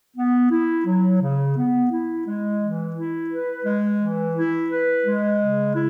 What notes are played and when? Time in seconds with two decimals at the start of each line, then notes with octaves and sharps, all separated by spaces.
0.17 B3
0.51 E4
0.86 F#3
1.21 C#3
1.57 B3
1.91 E4
2.26 G#3
2.61 E3
2.95 E4
3.30 B4
3.65 G#3
4.00 E3
4.36 E4
4.70 B4
5.05 G#3
5.41 C#3
5.74 E4